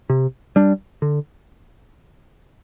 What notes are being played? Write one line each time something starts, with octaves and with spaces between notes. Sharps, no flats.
C3
G3 D4
D3